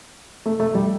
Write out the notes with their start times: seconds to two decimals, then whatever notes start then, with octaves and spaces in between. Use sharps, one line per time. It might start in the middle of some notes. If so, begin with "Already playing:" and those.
0.46 A3
0.60 A3
0.75 G3